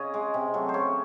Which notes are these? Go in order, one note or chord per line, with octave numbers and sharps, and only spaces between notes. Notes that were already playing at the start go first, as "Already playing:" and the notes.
Already playing: C#3 C#5 D#5
G#3
C3
F#3 A3
C5
C#3 C#5